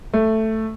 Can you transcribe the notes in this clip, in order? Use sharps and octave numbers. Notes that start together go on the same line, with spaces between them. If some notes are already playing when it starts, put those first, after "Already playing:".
A3